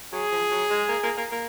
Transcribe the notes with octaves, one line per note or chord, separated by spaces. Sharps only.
F#3 G#4
F3
F#3
G#3
A#3
A#3
A#3
A#3